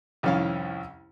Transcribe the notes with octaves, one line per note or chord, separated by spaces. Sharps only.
C2 F2 D#3 C#4 E4 F5